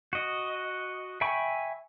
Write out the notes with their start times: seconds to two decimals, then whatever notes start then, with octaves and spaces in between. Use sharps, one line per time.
0.13 F#4 D#5
1.21 E5 G5 G#5 B5 C#6